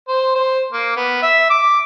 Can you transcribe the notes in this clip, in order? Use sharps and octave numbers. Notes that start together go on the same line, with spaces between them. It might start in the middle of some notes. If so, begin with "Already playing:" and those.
C5
C5
A#3
B3
E5
D6